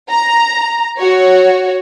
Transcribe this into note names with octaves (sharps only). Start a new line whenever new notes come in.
A#5
F#4 C#5